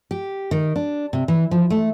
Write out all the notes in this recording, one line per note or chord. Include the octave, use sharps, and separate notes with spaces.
G4
D#3
D4
C3
E3
F3
A3